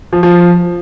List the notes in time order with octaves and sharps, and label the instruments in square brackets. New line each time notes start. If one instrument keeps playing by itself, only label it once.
[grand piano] F3
F3